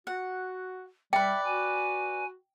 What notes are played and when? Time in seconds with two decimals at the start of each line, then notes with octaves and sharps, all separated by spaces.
0.07 F#4 F#5
1.13 G3 B4 D5 E5 G5
1.44 F#4 G#5